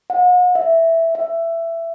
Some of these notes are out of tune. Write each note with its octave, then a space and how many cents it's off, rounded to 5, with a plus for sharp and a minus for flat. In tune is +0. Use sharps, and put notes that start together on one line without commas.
F#5 -45
E5 +0
E5 +15